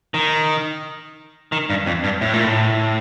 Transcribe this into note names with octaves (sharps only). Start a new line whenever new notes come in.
D#3
D#3
G2
F2
G2
A2
A#2
A2